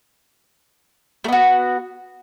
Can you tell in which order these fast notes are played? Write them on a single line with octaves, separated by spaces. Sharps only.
A3 B3 F#4